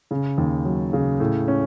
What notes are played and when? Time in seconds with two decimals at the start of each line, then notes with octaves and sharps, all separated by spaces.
0.11 C#3
0.38 D#2
0.65 F#3
0.93 C#3
1.20 A2
1.48 C#4